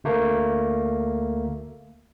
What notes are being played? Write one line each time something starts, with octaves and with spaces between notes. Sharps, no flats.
D2 A3 A#3